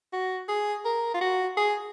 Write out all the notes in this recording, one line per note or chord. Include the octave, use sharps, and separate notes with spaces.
F#4
G#4
A#4
F4
F#4
G#4